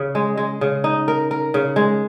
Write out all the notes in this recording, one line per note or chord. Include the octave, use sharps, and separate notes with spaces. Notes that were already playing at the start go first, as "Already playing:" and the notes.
Already playing: C#3
G#3
G#3
C#3
D#4
A#4
A#4
C#3
G#3